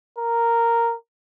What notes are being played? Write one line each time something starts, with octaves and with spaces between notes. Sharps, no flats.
A#4